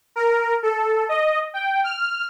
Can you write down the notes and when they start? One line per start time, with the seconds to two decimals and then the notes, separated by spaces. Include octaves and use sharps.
0.16 A#4
0.63 A4
1.09 D#5
1.54 G5
1.84 F6